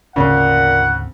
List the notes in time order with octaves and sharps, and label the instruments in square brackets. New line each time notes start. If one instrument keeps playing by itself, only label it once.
[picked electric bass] G#1 D2 C4 [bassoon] A#2 [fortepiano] C#3 [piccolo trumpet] F#5